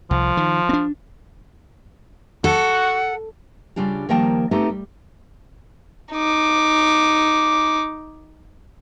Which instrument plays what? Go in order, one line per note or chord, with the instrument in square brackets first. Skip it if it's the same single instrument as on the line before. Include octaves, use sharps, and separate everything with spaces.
[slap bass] C2 [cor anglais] F3
[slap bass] D#3
C4 D4
[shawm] F#4 [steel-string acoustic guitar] A4 [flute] F#5
[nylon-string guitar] C#3 G3 D4 F4 G4
D#3 F3 G3 A#3 G5 A5
A3 B3 C4 D#4 G4 A4
G3
[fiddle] D#4 D6